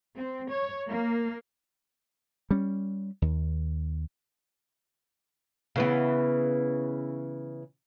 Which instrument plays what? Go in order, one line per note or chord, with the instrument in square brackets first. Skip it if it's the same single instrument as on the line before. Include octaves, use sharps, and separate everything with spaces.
[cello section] C4
C#5
A#3
[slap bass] G3 C#4
D#2
[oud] C#3 E3 B3